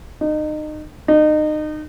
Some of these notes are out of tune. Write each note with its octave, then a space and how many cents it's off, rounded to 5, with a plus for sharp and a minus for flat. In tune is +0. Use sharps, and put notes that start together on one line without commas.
D#4 -30
D#4 -30